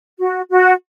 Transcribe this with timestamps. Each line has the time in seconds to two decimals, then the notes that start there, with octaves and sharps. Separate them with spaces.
0.18 F#4
0.49 F#4